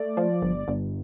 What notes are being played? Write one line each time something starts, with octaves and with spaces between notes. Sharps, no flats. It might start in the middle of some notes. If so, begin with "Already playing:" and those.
Already playing: A3 D5
F3
G1
G1